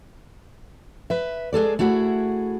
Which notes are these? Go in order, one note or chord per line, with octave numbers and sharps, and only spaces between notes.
B4 E5
G#3 G#4 A4 D5
A3 E4 F#4 G#4 F#5